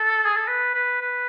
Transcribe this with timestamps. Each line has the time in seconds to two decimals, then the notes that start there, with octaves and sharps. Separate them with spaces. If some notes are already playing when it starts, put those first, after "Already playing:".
Already playing: A4
0.26 G#4
0.36 A4
0.48 B4
0.75 B4
1.01 B4